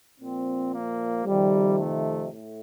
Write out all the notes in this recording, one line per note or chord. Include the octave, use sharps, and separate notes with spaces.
A#2 F3 C4
A#3
F2 C3 D#3 G3
A3
A2 A3